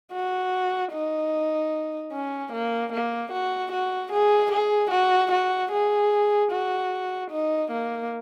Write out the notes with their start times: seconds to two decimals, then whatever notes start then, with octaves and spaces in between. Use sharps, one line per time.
0.12 F#4
0.92 D#4
2.12 C#4
2.52 A#3
2.93 A#3
3.32 F#4
3.72 F#4
4.11 G#4
4.51 G#4
4.91 F#4
5.31 F#4
5.71 G#4
6.51 F#4
7.30 D#4
7.71 A#3